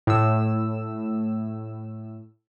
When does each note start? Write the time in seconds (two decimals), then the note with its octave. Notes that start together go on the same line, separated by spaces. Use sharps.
0.07 A2 E6